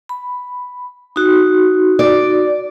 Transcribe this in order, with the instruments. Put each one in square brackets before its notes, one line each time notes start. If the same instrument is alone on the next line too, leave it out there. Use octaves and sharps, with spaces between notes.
[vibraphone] B5
D#4 F#4
[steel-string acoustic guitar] D5